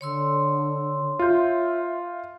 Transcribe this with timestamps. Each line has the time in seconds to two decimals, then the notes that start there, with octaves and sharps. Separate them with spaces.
0.01 D3 C#5 C6 E6
1.19 F4 E5 G6